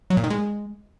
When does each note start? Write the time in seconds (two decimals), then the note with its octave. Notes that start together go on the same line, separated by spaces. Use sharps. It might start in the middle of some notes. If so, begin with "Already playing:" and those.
0.10 F#3
0.17 A#2
0.24 D#3
0.30 G#3